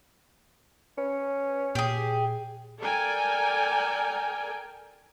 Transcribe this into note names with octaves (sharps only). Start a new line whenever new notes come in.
C#4 B4
A#2 G4 G#4
A4 A#4 D5 G5 G#5